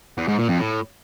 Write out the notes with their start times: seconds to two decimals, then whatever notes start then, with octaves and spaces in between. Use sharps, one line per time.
0.18 E2
0.28 G#2
0.39 A#2
0.49 F2
0.60 A2